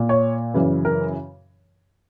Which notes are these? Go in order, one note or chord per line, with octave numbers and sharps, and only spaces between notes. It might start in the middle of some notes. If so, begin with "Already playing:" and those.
Already playing: A#2
C#5
F#2 C#3 E3
A#4